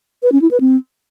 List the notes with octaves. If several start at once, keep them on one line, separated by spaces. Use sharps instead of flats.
B4
C#4
E4
B4
C4